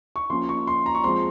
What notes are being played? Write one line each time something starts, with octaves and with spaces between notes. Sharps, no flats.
C#6
F3 A#3 C#4 C6
C#6
C6
A#5
C#6
F3 G#3 C4 C6